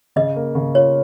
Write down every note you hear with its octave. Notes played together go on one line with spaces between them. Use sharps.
C#3 D#5
A#3
C#3
F4 C#5